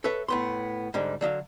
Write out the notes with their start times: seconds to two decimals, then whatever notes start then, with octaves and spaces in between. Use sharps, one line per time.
0.04 A4 B4 C#5 E5
0.28 A2 B3 C6
0.94 G#2 D3 G3
1.21 D3 F#3 D#5 F5